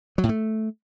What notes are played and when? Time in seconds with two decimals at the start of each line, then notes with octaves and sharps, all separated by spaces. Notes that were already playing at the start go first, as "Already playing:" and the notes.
0.18 F#3
0.24 A2
0.29 A3